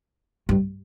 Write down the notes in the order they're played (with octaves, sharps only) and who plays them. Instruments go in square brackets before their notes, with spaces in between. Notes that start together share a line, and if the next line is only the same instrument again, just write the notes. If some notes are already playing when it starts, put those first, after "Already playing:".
[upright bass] G2